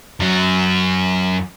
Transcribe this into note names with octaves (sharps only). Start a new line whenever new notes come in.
F#2 F#3